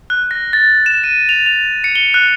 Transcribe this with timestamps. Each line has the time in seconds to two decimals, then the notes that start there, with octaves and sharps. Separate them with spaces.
0.10 F#6
0.31 A#6
0.53 A6
0.86 E7
1.04 D#7
1.29 F7
1.46 F7
1.84 C#7
1.96 G7
2.14 F#6